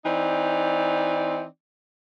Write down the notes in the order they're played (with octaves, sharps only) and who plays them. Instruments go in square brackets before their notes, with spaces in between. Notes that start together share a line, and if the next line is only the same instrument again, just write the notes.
[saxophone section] E3 C4 D#4 D5